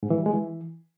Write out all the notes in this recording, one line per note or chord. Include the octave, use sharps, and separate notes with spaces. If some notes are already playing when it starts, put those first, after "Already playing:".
G#2
E3
G3
G#3
E3